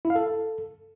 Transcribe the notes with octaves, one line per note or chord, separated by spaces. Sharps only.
E4
F5
A4